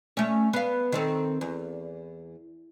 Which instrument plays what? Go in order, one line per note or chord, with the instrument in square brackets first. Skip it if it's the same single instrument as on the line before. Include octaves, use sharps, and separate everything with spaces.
[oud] A3 C#4
B3 F5
D#3 C4 A4
E2